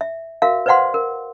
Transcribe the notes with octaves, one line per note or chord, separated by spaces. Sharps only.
E5
F#4 A#4 E5 F5
B4 C5 D5 F5 F#5 C6
A#4